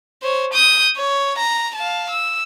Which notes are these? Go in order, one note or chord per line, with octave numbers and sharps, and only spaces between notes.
C5 C#5
D#6 G6
C#5
A#5
F5 A5
E6